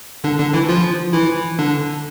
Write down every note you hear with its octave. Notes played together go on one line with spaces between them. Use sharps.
D3 D4
D3 D4
E3 E4
F3 F4
E3 E4
D3 D4